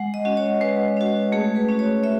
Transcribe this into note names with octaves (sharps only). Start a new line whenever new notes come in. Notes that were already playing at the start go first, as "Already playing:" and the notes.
Already playing: G#3 F#5
D#5
C#4 F#4
C#5
G#3 B4
C#4 F#4
A3 G#4
B4
C#4 F#4
C#5
A3 E5